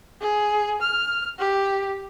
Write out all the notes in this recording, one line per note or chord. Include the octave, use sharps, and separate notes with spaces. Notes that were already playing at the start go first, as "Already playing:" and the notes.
G#4
F6
G4